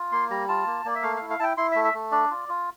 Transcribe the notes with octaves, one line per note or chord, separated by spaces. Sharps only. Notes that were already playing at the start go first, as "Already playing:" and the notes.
Already playing: F4
A#3 C6
G3 A#5
F4 A5
A#3
A#3 D5
E5
A3 F5
F5
E4
F5
E4 G5 A5
E4 C6
E5
A3
E5
A3
D4 D5
F4
F4